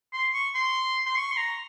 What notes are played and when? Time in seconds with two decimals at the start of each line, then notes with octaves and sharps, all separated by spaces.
0.13 C6
0.34 C#6
0.55 C6
1.06 C6
1.17 C#6
1.32 C6
1.37 A#5